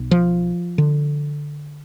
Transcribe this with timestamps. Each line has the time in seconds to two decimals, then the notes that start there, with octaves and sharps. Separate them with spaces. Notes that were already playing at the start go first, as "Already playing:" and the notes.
Already playing: B1
0.11 F3
0.78 D3